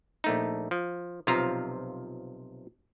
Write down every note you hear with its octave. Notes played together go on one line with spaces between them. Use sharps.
A#1 A3 D#4
F3
B1 C3 F3 F4 F5 A#5